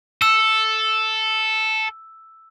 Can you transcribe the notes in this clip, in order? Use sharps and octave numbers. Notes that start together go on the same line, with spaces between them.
A4 E6